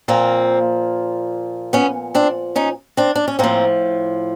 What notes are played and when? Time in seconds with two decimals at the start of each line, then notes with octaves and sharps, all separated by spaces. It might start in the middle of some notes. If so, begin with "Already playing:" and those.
0.08 A#2 F3 A#3 C4
1.73 B3 C#4
2.15 C4 D4
2.56 C#4 D#4
2.97 C4 D4
3.16 D4
3.28 C#4
3.39 A2 F3 A#3 C4